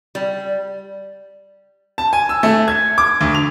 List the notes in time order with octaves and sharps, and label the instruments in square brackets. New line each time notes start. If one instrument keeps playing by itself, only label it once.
[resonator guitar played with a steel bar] G3
[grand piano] A5
G#5
E6
A3
G#6
D6
D2
F7